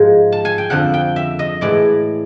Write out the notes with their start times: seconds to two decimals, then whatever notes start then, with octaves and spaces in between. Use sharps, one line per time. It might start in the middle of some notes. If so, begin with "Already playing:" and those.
Already playing: G#2 F3 G#3
0.32 A5
0.45 G#5
0.58 G5
0.70 F2 D3 F3 F#5
0.94 G5
1.16 E5
1.39 D#5
1.61 A2 E3 G#3 D5